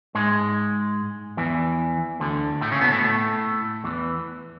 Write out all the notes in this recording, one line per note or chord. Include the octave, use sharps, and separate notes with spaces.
G#2 G#3
E2 E3
D2 D3
A2 A3
C#3 C#4
B2 B3
A2 A3
A2 A3
E2 E3